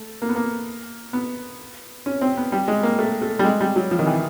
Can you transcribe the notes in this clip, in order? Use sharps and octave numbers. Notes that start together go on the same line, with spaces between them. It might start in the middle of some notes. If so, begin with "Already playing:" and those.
Already playing: A3
A#3
B3
A#3
B3
C#4
C4
B3
G3
G#3
A#3
A3
A3
G3
G#3
G3
F#3
F3
D#3
E3